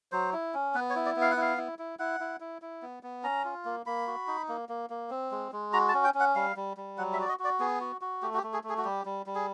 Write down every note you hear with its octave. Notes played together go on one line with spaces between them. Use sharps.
F#3 C5
E4
C#4
B3 B4
C#5
E4
D5
B3
F5
F#5
E4 F5
E4
E4
E4 F#5
E4
E4
E4
B3
B3
C#4 A#5
F4
A#3
A#3 B5
F#4
D#4
A#3
A#3
A#3
C4
G#3
G#3
F#4 A#5
A5
C#4
G5
C#4
F#5
G3 F5
G3
G3
F#3 F#5
E5
F#4 D5
D#5
F#4
D5
B3 G#4
F#4
F#4
A3 G4
F#4
G4
A3
G#4
A3
G#4
F#4
G3 G4
G3
G3
G#4